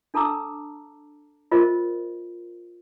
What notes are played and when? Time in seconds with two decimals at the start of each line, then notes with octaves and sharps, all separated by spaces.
0.14 D4 A4 A5 A#5 D6 E6
1.52 F4 A#4 C5 D#5